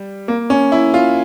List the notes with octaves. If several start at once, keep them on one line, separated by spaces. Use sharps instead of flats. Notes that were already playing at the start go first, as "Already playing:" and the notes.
Already playing: G3
A#3
C#4
E4
F4